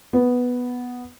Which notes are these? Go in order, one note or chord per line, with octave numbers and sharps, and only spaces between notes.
B3